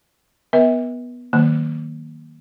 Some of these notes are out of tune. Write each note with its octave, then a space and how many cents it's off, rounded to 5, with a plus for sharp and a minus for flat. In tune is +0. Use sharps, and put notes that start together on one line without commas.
B3 -5 B4 -45 E5 -40
D#3 +0 F#3 +10 A#3 +0